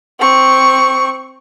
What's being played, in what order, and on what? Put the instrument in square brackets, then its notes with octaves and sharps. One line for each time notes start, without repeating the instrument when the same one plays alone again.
[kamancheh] C4 C#6